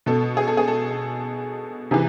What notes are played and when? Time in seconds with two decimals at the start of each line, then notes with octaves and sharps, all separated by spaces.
0.06 B2 A4
0.37 G#4
0.47 A4
0.57 G#4
0.68 A4
1.91 C3 E3 G#4